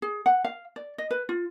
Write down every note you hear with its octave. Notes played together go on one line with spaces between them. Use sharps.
G#4
F#5
F5
D5
D#5
B4
F4